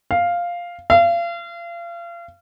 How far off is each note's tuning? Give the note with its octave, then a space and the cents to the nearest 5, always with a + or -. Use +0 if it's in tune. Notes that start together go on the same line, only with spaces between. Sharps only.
F5 +0
F5 -35